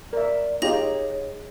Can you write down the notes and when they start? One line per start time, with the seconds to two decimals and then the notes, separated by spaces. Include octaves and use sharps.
0.13 A#4 D5 E5
0.62 D#4 F4 G4 G#4 C#5 A#6 F7